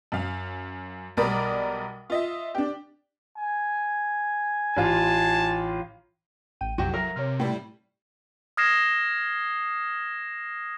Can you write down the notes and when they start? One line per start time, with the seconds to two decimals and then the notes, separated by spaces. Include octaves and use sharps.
0.12 F#2 F5
1.17 B1 G3 A#4 D5 B5 D#6
2.10 F4 D#5 E5
2.55 D4 G4
3.36 G#5
4.77 A1 F4 A5
6.61 A1 G5 D#7
6.78 A#1 F2 C3 F#3 F#4 G4
6.94 A#4 E5 F5
7.16 C3 C#5 F6
7.40 A2 G3 G5
8.57 D#6 F6 G#6 A#6 C7 E7